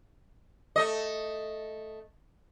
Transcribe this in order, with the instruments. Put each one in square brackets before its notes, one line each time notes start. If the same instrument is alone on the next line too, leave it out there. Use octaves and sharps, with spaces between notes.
[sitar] A3 D#5